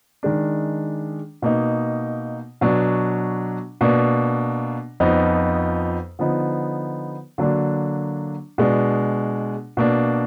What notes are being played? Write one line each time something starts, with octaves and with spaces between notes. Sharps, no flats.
D#3 G#3 D4
B2 A#3 D#4
B2 F#3 D4
B2 A#3 D4
F2 F3 B3 D#4
D3 F3 B3 D#4
D3 F#3 A#3 D4
B2 G#3 D4
B2 A#3 D4